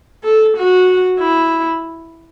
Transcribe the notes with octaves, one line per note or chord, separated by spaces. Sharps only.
A4
F#4
E4